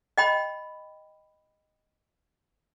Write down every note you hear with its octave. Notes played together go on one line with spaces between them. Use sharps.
D#5 G5 B5